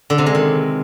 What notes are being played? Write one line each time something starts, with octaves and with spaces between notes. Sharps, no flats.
D3
C3
G#3
D#3